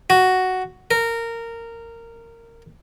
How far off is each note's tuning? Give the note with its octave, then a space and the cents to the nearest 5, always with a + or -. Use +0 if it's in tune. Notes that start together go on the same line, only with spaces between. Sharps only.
F#4 +5
A#4 -15